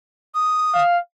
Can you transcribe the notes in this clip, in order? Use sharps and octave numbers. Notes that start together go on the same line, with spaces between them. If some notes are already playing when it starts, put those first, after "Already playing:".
D#6
F5